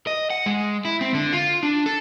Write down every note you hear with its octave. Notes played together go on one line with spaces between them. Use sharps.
D#5
F#5
G#3
E4
C4
D3
F4
D4
A4